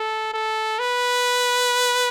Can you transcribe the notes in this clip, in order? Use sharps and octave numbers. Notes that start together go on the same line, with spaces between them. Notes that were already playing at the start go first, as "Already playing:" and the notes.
Already playing: A4
A4
B4